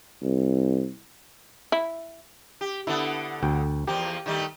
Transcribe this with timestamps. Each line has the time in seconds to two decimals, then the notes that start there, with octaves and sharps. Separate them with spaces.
0.22 C2
1.72 E4
2.61 G4
2.87 D3 B3 E4 A4
3.43 D2 G5
3.87 E2 F3 A#3 G4
4.26 D#3 G3 A3